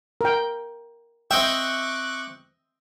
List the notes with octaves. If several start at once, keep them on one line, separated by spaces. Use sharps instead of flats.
A#4 G5
C4 D#5 E5 G5 C#6 D6 F#6